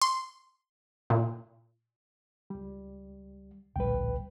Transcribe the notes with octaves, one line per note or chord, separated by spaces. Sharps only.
C6
A#2
C#2 G3
D1 A#1 G3 B4 G5